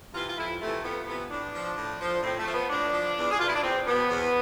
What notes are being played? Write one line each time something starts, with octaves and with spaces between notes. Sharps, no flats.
C3 E3 F4
F4
F2 E4
C3 E3 A3
F2 B3
C3 E3 B3
A2 D4
F3
A2
F3
A2 C4
A3
F3
B3
A2 D4
F3
E2
G#4
B2 F4
E4
D4
E2 C4
B2 B3
E2